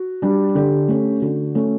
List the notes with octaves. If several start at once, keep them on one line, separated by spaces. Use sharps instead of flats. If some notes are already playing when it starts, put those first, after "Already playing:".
Already playing: F#4
G3 D4
D3 G4
A3 C#4
D3 F#4
A3 C#4